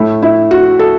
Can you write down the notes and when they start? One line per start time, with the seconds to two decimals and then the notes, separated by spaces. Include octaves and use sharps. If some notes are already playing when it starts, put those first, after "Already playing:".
Already playing: A2 A3 E4
0.22 E4
0.51 F#4
0.79 A4